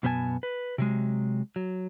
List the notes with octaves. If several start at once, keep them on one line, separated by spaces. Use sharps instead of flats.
F#2 B2 B3 C5 G#5 A5
B4
C3 F#3 G#3
F#3